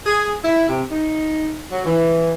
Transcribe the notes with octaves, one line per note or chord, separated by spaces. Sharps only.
G#4
E4
C3
D#4
F#3
E3